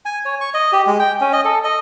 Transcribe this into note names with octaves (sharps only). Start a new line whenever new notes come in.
G#5
C#5
C#6
D#5
G4
G#3
G5
C#4
D#5
A4
D#5